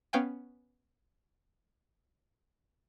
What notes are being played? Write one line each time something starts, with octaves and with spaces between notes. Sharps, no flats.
B3 C#4 F5 G5 G#5